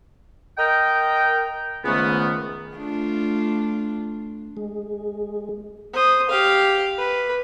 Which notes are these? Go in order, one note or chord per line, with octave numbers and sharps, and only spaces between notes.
A#4 D#5 G5
C#2 G#2 D#3 A3 B3
A3 D4 F4
G#3
C5 D#6
G4 F5
B4